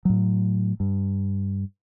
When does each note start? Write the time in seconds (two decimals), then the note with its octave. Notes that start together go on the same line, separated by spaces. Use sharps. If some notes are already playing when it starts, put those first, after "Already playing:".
0.05 A2 F#3
0.80 G2